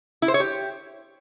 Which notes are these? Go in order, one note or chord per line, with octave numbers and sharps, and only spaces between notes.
E4
C5
C#5
G4